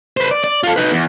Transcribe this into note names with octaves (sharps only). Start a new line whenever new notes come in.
B4 C5
D5
D5
F4 A4
D#4 B4
E2